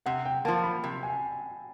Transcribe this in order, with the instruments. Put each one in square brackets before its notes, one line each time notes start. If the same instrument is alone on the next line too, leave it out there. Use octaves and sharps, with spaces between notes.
[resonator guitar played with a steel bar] C3 [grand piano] F#5
[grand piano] G5
[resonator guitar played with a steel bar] F3 A#3 [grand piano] A5
[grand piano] B5
[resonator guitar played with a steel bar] C3
[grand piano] G#5